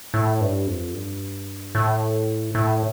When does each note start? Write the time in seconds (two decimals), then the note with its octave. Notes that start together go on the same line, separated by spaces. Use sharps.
0.14 A2
0.41 G2
0.67 F2
0.94 G2
1.75 A2
2.55 A2